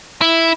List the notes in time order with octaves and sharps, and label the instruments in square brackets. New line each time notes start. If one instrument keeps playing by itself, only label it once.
[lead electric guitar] E4